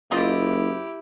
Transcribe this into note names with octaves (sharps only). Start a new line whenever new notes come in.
F#1 A#3 E4 F4 G4 D#5